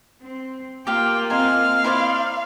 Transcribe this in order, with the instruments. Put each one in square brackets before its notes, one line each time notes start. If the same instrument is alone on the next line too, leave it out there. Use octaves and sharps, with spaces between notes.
[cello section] C4
[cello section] A#3 F4 [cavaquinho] G4 F5 [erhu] G5
[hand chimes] C4 D#5 A#5 [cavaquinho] C5 G#5 [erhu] F5
[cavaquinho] E4 C5 D5